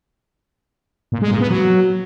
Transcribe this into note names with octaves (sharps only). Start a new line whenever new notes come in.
A#2
G#3
A#2
B3
F#3